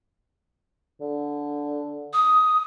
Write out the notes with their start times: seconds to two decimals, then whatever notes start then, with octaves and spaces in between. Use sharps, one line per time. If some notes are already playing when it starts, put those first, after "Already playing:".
1.00 D3
2.13 D#6